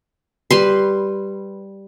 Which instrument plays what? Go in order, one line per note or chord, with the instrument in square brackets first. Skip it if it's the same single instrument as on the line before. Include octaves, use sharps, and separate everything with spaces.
[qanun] G3 B4 C6